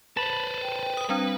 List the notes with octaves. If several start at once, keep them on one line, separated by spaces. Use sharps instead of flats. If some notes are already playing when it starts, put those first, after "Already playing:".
B4 C5 A5 B5
G5
D#6
G3 C4 D4 B4 G5